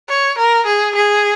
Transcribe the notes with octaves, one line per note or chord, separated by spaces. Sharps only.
C#5
A#4
G#4
G#4